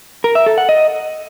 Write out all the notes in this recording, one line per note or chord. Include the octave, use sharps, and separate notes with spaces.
A#4
E5
A4
F#5
D#5